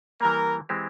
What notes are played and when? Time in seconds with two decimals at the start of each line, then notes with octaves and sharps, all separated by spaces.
0.21 E3 G3 A#3 A#4
0.69 E3 G#3 C4 G4 C5